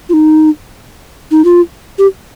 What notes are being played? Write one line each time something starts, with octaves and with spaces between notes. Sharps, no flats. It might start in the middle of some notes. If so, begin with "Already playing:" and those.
F4
D#4
D#4
F4
G4